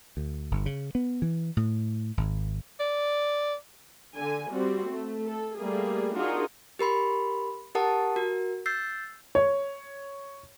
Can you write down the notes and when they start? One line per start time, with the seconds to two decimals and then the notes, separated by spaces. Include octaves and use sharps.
0.17 D2
0.51 G1
0.66 C#3
0.95 B3
1.22 E3
1.57 A2
2.17 G#1
2.80 D5
4.16 D3 G#5
4.52 G3 C4 F#4
4.91 A3
5.27 A4
5.59 G3 A3 A#3 G#4
6.15 D4 D#4 F4 F#4 G#4 A#4
6.79 G4 A#4 B5 C6
7.75 G4 A#4 F#5 A5 D#6
8.16 F#4 A#4
8.66 E6 G6 A6 C7
9.35 C#5